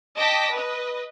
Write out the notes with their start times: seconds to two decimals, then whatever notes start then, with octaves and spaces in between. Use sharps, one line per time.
0.17 D#5 G5 A5 D6 A#6 B6
0.53 B4 D#5